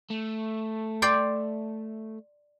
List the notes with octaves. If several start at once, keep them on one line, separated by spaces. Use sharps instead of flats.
A3
D5 G5 C6